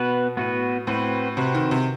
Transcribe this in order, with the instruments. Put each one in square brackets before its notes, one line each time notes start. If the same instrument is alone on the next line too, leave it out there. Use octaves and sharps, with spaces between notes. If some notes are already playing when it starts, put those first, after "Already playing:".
Already playing: [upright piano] B2 [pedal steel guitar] B3 F#4 B4
[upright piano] A2 [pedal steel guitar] B3 F#4 B4
[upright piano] A2 [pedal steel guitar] C4 F#4 B4
[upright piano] C3 [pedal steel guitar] C4 F#4 B4
[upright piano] D#3
C3